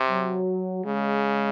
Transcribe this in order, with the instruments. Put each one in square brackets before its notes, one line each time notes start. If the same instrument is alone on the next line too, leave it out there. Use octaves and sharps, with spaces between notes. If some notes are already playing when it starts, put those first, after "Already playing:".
Already playing: [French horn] C3
[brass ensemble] F#3
[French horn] C#3 [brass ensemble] G#3